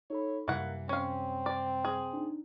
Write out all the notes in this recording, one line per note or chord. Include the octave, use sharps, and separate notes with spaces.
D#4 A4 C#5 B5
F#2 C3 E3 G3 A#3 F#5
C4 C#4 F5
D5
G#4
D4 D#4